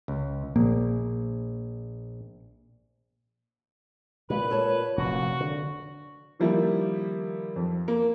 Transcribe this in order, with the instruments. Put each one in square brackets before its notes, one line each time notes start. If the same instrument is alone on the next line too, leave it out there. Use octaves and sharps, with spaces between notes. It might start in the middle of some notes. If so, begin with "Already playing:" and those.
[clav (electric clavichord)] C#2
[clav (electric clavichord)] A#1 [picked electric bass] A#3
[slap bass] A#2 [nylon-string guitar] G#3 [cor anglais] B4
[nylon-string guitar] A4 C#5 A5
[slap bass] F1 A#2 [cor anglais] F#4
[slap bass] D3
[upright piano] D#3 F3 G3 A#3 E4
F2
A#3